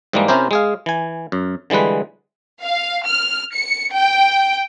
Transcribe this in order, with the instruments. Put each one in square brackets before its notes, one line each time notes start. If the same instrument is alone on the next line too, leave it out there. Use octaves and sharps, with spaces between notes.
[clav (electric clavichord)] G#2 E3 G3 G#3 A#3
C3 C#4 E4 G4 A#4 C5
G#3 G#4 F5
E3 G#5
F#2
D3 E3 G3 G#3 B4
[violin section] F5
F6
C#7
G5